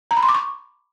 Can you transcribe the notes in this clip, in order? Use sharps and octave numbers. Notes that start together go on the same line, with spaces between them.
A#5
B5
C6
D6
C#6